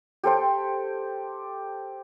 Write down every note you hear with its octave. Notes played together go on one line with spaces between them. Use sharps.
G4 A4 C5 G5